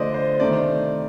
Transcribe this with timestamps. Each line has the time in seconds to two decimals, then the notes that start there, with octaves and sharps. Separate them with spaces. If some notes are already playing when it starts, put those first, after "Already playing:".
Already playing: D3 F3 A3 C5 D5 D#5
0.14 C5
0.40 C3 D#3 A3 C4 D5